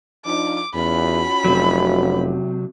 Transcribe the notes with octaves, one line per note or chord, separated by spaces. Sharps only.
F3 D4 D#4 D6
E2 C#4 F4 F#4 B5
F1 C3 F#3